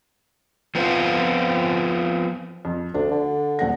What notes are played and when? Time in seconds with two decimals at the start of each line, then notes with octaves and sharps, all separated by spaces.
0.75 F3 B3 C4 F4
2.65 F2
2.94 D2 D4
3.11 D3
3.59 D#1 F#5 A#6